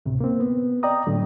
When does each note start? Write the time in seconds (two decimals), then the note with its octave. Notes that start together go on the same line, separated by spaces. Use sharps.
0.06 D2 A2 C3
0.20 A#3 C4
0.40 B3
0.83 D5 D#5 G5 A#5 D#6
1.07 A2 D3 F#3 A3